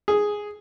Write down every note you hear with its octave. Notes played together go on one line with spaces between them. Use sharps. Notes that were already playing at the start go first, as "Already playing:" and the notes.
G#4